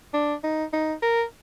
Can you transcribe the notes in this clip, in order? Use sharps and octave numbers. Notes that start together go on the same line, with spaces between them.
D4
D#4
D#4
A#4